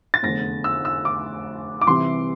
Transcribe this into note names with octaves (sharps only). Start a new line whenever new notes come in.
A6
F1 E2 D3 A#6
E6
E6
D6
D6
C2 C3 E3 C6